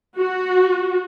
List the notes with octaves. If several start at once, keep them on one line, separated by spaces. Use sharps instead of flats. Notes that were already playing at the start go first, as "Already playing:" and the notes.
F#4